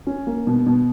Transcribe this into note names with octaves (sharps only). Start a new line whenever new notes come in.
C#4
A#3
B2
B2